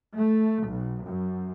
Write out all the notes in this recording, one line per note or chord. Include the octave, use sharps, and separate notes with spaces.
A3
B1
F#2